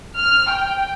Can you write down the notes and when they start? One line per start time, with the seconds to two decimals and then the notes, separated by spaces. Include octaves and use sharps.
0.17 F6
0.49 G5